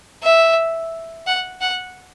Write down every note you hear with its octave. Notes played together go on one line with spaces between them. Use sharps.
E5
F#5
F#5